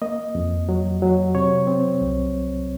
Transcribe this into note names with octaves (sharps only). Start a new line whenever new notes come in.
A#3 D#5
F2
F#3
F#3
C3 C#5
C4
C2